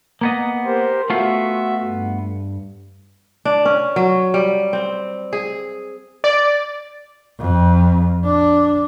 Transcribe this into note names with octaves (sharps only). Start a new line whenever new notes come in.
A#3 B3 D#5
G4 A#4 C5
A3 B3 F4 F#4 E5
G2
D4
C#4
F#3
G3
C4
G#4
D5
F2
D4